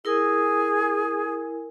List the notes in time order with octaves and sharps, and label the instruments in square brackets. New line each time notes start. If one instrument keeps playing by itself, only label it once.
[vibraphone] E4 A#4 G#5 [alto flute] G#4